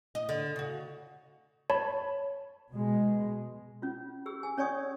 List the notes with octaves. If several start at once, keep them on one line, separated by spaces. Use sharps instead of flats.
D#5
D3
C#3 F#4
C#5 A5 B5
B2 G#3
C#4 F4
G4 G#4 E6
G#4 G#5
C#4 C#5 D5 G#5 C#6 D#6